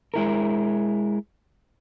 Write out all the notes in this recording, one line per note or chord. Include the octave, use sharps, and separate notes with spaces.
G#3 E4 A#4